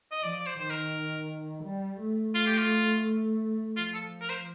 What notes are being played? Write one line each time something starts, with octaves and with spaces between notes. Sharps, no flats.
D#5
F3 D5
D5
C5
D#3 C5
A#4
G3
A3
A3 F4
G4
F4
F3 F4
A4
A#4
C5